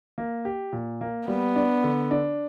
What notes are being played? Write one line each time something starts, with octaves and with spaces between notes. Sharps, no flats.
A#3
G4
A#2
A#3
G3 B3
D4
D3
D4